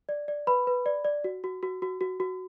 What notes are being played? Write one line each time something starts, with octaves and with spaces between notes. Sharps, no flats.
D5
D5
B4 B5
B4
D5
D5
F#4
F#4
F#4
F#4
F#4
F#4